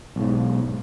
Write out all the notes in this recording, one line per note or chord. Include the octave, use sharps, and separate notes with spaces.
B1 G#2